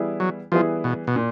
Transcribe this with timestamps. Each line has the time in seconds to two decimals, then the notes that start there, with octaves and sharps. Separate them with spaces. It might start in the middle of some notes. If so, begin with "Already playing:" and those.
Already playing: E3 G3 B3 E4 G#4
0.20 F#3
0.52 E3 F3 G3 B3 E4 G#4
0.84 B2
1.07 B2
1.16 A#2